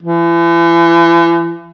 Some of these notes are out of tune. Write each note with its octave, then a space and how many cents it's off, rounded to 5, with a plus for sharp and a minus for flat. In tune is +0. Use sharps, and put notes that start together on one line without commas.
E3 +40